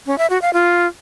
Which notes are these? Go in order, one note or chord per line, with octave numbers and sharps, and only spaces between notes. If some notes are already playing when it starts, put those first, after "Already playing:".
C#4
E5
F#4
F5
F4